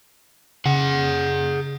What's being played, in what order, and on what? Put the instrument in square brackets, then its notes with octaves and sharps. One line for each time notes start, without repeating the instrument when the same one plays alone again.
[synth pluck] C#3 [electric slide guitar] G#4 F#5